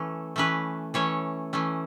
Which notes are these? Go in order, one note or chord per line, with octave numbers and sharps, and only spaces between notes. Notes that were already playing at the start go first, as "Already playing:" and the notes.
Already playing: E3 A3 C#4
E3 A3 C#4 B4
E3 A3 C#4 C#5
E3 A3 C#4